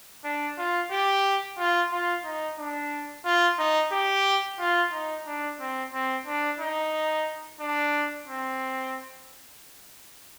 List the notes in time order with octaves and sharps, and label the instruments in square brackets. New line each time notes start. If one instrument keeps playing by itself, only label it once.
[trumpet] D4
F4
G4
F4
F4
D#4
D4
F4
D#4
G4
F4
D#4
D4
C4
C4
D4
D#4
D4
C4